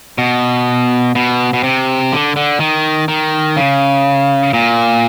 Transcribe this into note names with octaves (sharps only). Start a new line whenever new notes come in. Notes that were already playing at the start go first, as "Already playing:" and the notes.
B2
B2
B2
C3
D3
D3
D#3
D#3
C#3
A#2